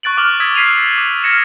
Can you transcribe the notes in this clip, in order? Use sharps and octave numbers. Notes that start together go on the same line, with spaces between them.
C#6 F#6 A6 D7 F#7
C#6 D6 F6 F#7
D#6 E6 G#6 B6
F6 B6 C7 D#7 F7
D6
F6 G#6 A#6 C#7 E7